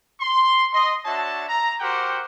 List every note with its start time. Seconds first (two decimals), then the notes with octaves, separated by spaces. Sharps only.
0.20 C6
0.73 D#5 C6
1.06 D4 F#4 C#5 E5 A5
1.49 A#5
1.80 F#4 G4 A#4 C5 F#5 G5